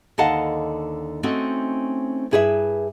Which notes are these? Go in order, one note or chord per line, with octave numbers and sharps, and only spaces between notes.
D#2 D3 D#5 F5 F#5 A5
A3 C4 C#4 D#4 F#4
G2 E4 G#4 B4 C5 E5